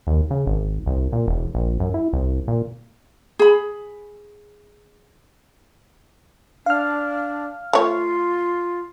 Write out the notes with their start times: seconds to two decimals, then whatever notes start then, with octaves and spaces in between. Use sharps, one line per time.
0.07 D#2
0.30 C#3
0.47 G#1
0.86 C2
1.12 A#2
1.28 E1
1.55 A#1
1.80 F#2
1.94 E4
2.13 C2
2.48 A#2
3.39 G#4 B5
6.66 D4 F5 F6
7.73 A3 F4 C#5